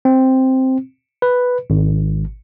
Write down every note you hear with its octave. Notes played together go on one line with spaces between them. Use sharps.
C4
B4
G#1